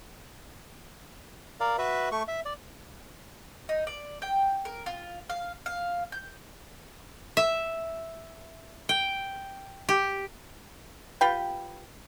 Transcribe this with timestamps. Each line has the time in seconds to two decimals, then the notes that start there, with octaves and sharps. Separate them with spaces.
1.60 A#4 D5 F5
1.78 F#4 B4 E5
2.12 A3 C#6
2.28 E5
2.45 D5
3.69 D#4
3.87 D5
4.22 G5
4.65 A#4
4.86 F4
5.30 F5
5.66 F5
6.12 G6
7.37 E5
8.89 G5
9.89 G4
11.21 F4 G4 B4 G5